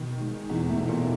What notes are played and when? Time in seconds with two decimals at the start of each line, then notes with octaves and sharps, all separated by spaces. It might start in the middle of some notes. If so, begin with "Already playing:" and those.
Already playing: B2 D#3
0.21 G#3
0.50 E2 B2 E3
0.69 A2 A3
0.79 B2
0.88 A#2 A#3